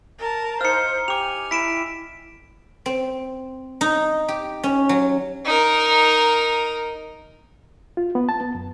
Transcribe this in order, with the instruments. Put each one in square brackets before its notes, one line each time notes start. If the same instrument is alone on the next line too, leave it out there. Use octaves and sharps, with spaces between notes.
[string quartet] A#4 A5
[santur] D#4 F5 [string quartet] C5 [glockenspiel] F6 C#7
[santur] G4 [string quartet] G#5 [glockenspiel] D6 F7
[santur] E4 [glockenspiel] B6 D7 E7
[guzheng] C4
D#4
G4
C#4
F#3
[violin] D#4 A#4
[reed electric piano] F4
B3
A5
B3
F#2